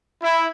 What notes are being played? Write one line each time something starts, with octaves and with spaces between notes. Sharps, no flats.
E4